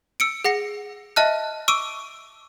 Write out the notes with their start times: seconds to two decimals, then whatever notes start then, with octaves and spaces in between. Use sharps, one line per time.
0.20 E6 C#7 D7
0.44 G#4 F#5 A#6 C#7
1.16 D#5 E5 A5 F6 F#6
1.68 C#6 D6 E6 D7 D#7